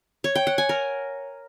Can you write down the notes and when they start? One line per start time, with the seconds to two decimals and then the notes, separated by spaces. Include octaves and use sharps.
0.24 C#5
0.35 G5
0.47 F#5
0.58 G#5
0.69 A#4